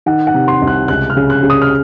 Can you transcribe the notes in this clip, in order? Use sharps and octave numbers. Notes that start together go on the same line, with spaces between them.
D#3 F#5
F#5
C3
C6
C2
F#6
C#2 F#6
F6
C#3
F#6
C#3
D#6
F6